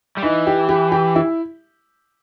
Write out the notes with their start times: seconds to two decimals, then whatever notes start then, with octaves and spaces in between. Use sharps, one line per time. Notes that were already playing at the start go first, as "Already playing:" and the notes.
0.18 G3
0.23 E3 D#4
0.47 G4
0.69 G4
0.92 G4
1.16 E4